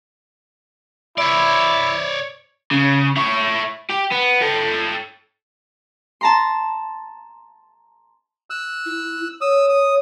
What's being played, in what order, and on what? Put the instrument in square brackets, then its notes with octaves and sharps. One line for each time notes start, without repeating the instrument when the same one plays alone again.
[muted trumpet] E4 [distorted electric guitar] C#5 D5
[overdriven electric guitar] C#3
E4 C#5
G4
B3
A4 G5
[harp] A5 A#5 C6
[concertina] E6 F#6
[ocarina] E4
[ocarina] C#5 [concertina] D#6 E6
[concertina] D#6